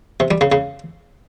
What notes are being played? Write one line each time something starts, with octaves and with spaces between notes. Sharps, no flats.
C3
G3
C#3
C#3